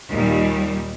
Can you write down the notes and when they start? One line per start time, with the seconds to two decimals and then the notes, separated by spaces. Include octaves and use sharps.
0.10 D#2 A#2 G3